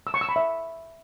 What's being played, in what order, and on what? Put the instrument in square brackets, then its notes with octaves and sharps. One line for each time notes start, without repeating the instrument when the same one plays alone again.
[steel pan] E6
C#6
E6
B5
E5